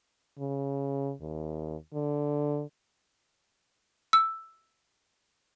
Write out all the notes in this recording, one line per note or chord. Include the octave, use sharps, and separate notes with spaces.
C#3
D#2
D3
E6